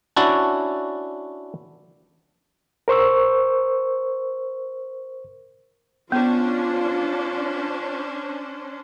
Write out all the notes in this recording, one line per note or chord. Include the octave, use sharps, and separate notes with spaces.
C#4 D4 E4 F#4 D5
A#4 C5 C#6 E6
B3 C#4 D4 F4 C5